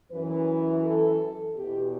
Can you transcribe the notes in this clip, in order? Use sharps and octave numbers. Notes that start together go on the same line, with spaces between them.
F#2 E3 B4
A4
E2 B2 G4